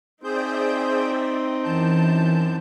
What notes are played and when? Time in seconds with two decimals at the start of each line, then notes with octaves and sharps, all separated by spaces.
0.24 C4 D#4 G#4 C5 D5 E5 G5 G6
1.64 F#2 E3 A5 G6